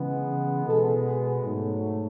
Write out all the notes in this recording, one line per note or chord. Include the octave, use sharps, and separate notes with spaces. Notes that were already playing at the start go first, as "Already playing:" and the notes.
Already playing: C#3 E3 G#3 B3
B2 G#3 B3 A4
G#4
G#2 F#3 A3